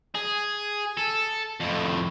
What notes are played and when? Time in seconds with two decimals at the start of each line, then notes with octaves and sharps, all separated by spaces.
0.15 G#4
0.97 A4
1.60 F2 A2